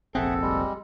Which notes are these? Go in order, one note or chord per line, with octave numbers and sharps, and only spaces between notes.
F1 A#1 C4 G#4 A4 E5 F#5
G3 G#3